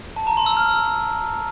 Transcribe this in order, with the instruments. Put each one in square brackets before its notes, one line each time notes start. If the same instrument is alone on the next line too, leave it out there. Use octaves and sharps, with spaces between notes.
[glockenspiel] A5
A#5
C6
E6
F6